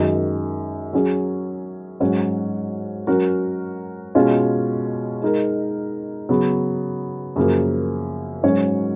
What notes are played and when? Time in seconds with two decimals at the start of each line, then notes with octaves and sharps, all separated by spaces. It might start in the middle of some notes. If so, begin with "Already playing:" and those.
Already playing: F#2 D#3 G#3
0.93 F#3 C#4 G#4
2.00 G#2 F#3 C#4 F#4 C#5
3.07 F#3 C#4 F#4 A#4
4.15 B2 G#3 C#4 F4
5.22 G#3 D#4 A#4
6.29 C#3 F#3 B3
7.36 F#2 C#3 F3 A#3
8.43 G#2 F#3 C#4 F#4 C#5